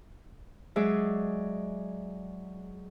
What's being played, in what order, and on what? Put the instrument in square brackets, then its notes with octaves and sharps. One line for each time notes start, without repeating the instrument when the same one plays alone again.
[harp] F#3 G#3 G#4 D5 E5 E6